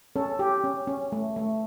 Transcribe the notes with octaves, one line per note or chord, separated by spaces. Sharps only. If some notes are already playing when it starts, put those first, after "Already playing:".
C#4 A4
G4
C#4
C#4
A3
A3